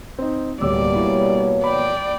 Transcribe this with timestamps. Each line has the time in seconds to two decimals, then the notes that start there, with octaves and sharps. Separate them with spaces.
0.18 C4 D#4
0.61 D1 B2 G3 A#3 C#5 D5 D6 E6
0.96 E4
1.64 D5 G5 B5